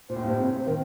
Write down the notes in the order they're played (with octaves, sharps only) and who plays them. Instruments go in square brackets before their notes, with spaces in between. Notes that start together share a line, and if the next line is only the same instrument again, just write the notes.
[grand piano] A#2 [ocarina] C5
[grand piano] A2
G2
A2
C3
[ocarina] C5
[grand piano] D#3 [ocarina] A#4